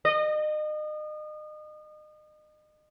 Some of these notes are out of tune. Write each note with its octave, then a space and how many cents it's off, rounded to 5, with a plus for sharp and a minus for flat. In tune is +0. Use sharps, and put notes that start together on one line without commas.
D#5 -35